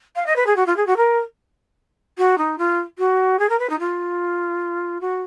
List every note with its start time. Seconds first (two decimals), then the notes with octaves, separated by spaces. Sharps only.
0.16 F5
0.26 D#5
0.36 B4
0.46 G#4
0.56 F#4
0.66 F4
0.76 G#4
0.86 F#4
0.96 A#4
2.18 F#4
2.38 D#4
2.58 F4
2.98 F#4
3.39 G#4
3.49 A#4
3.59 B4
3.69 D#4
3.79 F4
5.01 F#4